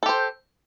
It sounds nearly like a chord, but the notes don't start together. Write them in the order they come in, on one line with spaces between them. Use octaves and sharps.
A4 G4 C5